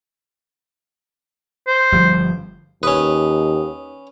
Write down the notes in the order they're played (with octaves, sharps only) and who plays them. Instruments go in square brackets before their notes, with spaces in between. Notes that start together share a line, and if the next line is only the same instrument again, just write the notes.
[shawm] C5
[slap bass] G1 F3 G3
[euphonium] D#2 [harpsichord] C#4 B4 [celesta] D#6